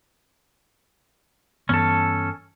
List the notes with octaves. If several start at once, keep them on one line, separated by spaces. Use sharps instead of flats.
G2 E3 B3 C#4 A4